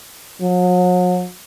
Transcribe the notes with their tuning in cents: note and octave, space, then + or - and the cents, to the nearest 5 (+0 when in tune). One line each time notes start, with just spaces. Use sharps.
F#3 -45